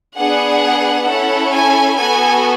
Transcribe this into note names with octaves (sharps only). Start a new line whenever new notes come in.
B3 D4 G#4 F#5
C#4 E4 A4 F#5
G#5
B3 F#4 A4 G#5